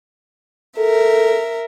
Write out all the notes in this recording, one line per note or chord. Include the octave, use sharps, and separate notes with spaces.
A4 A#4 E5